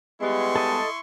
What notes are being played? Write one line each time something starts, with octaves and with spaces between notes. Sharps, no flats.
G3 G#3 B3 E4 C6 C#6
A4 D#5 A5